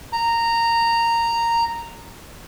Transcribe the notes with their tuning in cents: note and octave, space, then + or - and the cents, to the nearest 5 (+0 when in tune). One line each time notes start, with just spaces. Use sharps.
A#5 -10